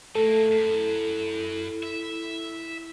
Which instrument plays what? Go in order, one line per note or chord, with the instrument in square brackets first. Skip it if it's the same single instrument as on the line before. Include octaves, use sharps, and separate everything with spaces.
[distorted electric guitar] A2 A#3 [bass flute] A3 [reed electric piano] A4
[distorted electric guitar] F#2
[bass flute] E4
[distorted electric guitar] E5